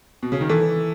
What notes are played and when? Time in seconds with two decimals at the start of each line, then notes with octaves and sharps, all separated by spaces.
0.23 B2
0.32 C#3
0.41 D#3
0.49 E3 A4